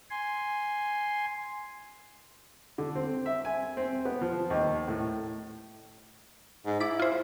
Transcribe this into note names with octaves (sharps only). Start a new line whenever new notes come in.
G#5 C6
D3
C4
E5
G#5
C4
B3
F3
D#2
A2
G#2
E4 D6 A6 B6
F4 C5